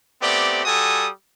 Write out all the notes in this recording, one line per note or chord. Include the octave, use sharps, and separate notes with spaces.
A3 B3 C4 G4 D5
G3 F#4 A4 G#5 D#6